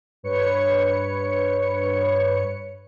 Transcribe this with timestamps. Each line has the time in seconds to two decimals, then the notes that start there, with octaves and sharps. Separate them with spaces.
0.23 G2 B4 C#5 C#7